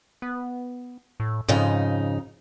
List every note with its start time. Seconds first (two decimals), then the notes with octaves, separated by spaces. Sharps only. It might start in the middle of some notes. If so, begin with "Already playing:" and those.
0.22 B3
1.20 A2
1.48 F2 G#2 C#3 D#4